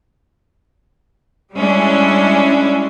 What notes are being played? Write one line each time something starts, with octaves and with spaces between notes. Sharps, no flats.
G3 G#3 C#4 D4 E4